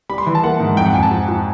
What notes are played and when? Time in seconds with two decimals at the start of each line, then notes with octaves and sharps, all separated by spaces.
0.09 G3 B5
0.18 C6
0.26 E3
0.35 A5
0.43 A#3 F#5
0.60 G#2
0.77 F2 G5
0.86 F#5
0.94 F2 G#5
1.03 A5
1.11 F3
1.28 F3